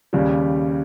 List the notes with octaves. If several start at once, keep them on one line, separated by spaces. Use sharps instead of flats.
D#2 C#3 G3